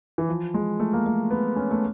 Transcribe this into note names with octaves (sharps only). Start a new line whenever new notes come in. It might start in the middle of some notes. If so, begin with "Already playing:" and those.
E3
F3
G#3
A3
A#3
A3
B3
C#4
A3